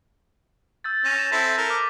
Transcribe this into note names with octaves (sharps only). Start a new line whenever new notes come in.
E6 G6 A6
C#4 A#6 D#7
A6 E7
C4 E4 A4 B6
A4 A#4
D6 F6